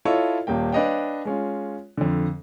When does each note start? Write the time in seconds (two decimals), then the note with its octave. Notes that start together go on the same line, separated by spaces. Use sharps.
0.05 E4 F4 A4 C#5 D#5
0.47 D#1 A#3 G5
0.72 D4 B4 C#5 D#5 F5 G5
1.25 G#3 C#4 F4
1.97 F2 D3